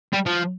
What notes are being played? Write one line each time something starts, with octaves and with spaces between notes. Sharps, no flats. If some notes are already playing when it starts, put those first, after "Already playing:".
G3
F3